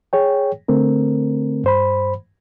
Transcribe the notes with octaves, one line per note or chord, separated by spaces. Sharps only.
G#4 C#5 G5
D3 A3 C4 A#4
G2 C5 B5